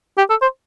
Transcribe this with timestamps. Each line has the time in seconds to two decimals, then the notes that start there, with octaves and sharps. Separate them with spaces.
0.18 G4
0.30 A4
0.42 C5